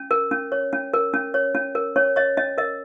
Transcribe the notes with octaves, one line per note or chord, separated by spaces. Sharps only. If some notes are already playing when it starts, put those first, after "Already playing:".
Already playing: C#4
A#4
C#4
C#5
C#4
A#4
C#4
C#5
C#4
A#4
C#4 C#5
C#5 D#5
C#4 D#5
A#4 D#5